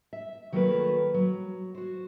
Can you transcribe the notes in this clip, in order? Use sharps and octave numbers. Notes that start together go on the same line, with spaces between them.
E5
D#3 F#3 A3 A#3 A#4 B4
F#3
F#4 C5